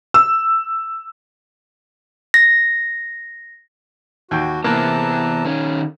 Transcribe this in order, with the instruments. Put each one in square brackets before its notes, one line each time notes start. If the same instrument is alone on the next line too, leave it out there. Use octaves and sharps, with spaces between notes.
[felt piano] E6
[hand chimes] A#6
[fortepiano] D#2 G5 [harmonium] F#4
[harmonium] C3 A5 A#5 [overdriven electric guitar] E3 B3 [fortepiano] A#3
[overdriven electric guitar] D#3 C#4